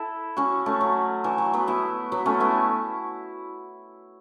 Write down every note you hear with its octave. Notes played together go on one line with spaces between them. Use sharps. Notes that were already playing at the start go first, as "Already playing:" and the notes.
Already playing: E4 A4
C#4 F#4
A3 C#4
F#3
E3
F#3
F#3 B3
B3 E4
F#3 B3
A3 C#4
B3 E4